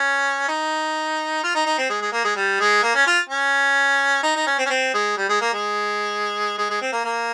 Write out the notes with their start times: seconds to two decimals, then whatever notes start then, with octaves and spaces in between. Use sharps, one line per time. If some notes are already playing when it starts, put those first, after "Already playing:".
Already playing: C#4
0.48 D#4
1.43 F4
1.55 D#4
1.66 D#4
1.78 C4
1.90 G#3
2.01 G#3
2.12 A#3
2.24 G#3
2.36 G3
2.60 G#3
2.83 A#3
2.95 C#4
3.07 F4
3.29 C#4
4.23 D#4
4.36 D#4
4.47 C#4
4.59 C4
4.66 C#4
4.70 C4
4.94 G#3
5.17 G3
5.29 G#3
5.41 A#3
5.53 G#3
6.58 G#3
6.70 G#3
6.81 C4
6.92 A#3
7.04 A#3